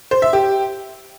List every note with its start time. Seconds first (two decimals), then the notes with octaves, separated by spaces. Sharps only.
0.11 C5
0.22 E5
0.33 G4